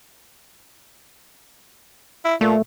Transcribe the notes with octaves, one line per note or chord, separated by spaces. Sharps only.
E4
A#2 A3